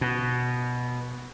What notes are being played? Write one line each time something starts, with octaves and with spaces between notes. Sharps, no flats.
B2